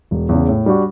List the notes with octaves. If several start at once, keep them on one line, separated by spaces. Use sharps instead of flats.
E1
E2 C#3
A2
G3 D4 F#4